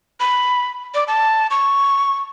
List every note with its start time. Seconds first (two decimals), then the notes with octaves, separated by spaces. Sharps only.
0.20 B5
0.95 D5
1.08 A5
1.51 C#6